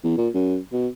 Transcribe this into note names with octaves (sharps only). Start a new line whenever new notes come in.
E2
A#2
F#2
B2